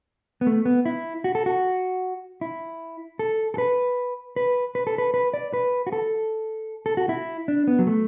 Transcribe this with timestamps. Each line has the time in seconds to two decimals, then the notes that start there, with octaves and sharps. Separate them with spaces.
0.41 B3
0.47 A3
0.66 B3
0.86 E4
1.24 F#4
1.35 A4
1.46 F#4
2.41 E4
3.19 A4
3.54 A4
3.58 B4
4.36 B4
4.75 B4
4.87 A4
4.98 B4
5.14 B4
5.34 D5
5.54 B4
5.87 F#4
5.93 A4
6.86 A4
6.97 F#4
7.09 E4
7.48 D4
7.67 B3
7.79 F#3
7.87 A3